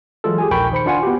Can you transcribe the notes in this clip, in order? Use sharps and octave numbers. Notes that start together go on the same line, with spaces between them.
E3 F#3 G#3 F4 A4
G4 G#4 G#5
A#1 D#2 A#4 G5 B5 C#6
D#3 C5 B5 C#7
D4 F4 F#5 G#5
B3 F#4 G4